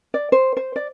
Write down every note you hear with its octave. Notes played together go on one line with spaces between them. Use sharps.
D5
C5
C5
D5